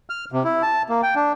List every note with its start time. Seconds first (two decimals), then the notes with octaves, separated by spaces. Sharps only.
0.10 F6
0.32 C3
0.44 E4
0.62 A5
0.89 A#3
1.03 G5
1.15 D4